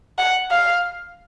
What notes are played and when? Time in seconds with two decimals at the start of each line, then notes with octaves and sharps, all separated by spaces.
0.18 F#5
0.51 F5